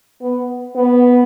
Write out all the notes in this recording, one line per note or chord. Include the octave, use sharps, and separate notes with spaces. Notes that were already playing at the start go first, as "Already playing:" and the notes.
B3
B3